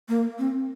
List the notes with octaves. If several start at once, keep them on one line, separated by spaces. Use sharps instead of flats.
A#3
C4